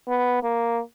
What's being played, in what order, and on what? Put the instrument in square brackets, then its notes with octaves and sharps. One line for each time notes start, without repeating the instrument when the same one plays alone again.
[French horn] B3
A#3